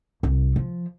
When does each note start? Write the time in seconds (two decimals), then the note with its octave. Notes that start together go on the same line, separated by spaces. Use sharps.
0.23 C2
0.56 F3